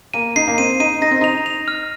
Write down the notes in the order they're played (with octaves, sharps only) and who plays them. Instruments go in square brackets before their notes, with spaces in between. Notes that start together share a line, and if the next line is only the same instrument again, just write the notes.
[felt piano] A#3 [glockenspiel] D#7
[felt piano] D#4 [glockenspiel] C7
[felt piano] A#3
[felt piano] C4 [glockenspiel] D#7
[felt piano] D#4 [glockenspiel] D#7
[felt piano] D#4 [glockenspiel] A#6
[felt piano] C4
[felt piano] D#4 [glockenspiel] F7
[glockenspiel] F7
F6